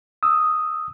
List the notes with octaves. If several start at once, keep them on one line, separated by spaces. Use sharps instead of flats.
D#6 E6